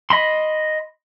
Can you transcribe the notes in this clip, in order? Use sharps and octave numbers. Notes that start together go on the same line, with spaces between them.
D#5 B5 C6